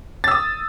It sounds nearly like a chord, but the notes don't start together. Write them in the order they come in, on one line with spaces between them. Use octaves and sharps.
A6 E6 D#6